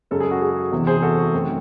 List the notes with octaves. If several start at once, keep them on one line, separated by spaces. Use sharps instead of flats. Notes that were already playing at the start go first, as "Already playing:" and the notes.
F#2 C#3 G#3 A4
G#4
F#4
G#4
E2 C3 E3
G#4 C5
F#4 A4
F#4
F#2 D#3 A3 C4